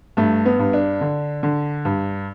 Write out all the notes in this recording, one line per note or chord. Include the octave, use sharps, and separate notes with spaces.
G2 A3
B3
G2
D4
D3
D3
G2